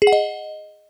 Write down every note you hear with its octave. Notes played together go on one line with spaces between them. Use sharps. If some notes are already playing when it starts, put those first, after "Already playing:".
G#4
F#5
D#5